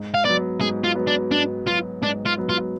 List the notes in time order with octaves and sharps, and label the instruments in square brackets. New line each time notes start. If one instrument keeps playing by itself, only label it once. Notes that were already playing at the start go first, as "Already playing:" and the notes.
Already playing: [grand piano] G#2
[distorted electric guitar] F5
[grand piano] F#3 B3 [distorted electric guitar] D5
[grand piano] G#2 [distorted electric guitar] G#4
[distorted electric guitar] F4
[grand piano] F#3 B3
[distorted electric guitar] D4
[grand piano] G#2 [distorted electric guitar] D4
[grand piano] F#3 B3 [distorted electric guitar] F4
[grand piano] G#2 [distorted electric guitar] D4
[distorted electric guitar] F4
[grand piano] F#3 B3
[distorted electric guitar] F4